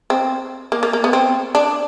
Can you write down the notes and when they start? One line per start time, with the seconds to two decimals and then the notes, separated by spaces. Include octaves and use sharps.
0.10 C4
0.72 A#3
0.83 A#3
0.93 A#3
1.04 B3
1.13 C4
1.55 D4